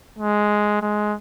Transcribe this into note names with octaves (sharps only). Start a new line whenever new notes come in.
G#3
G#3